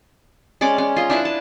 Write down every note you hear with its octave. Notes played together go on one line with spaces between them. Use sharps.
G#3 C#4 D5 D6
C#4
F4 D#5
D4 E4 B4
A5